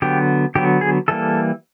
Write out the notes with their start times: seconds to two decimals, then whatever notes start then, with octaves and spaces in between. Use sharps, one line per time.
0.02 D3 F#3 B3 G4
0.55 D3 F#3 B3 G4
0.81 G#4
1.08 E3 G3 A#3 A4